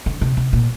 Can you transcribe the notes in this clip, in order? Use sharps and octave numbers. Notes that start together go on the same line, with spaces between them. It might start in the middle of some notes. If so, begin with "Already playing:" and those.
D3
C3
C3
A#2